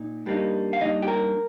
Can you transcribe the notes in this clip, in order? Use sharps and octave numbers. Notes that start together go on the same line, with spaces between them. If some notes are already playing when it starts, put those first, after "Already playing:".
Already playing: A#2 D#4
G2 G3 A#3 D#4
F5
G2 G3 A#3 D#4 D#5
G4
A#4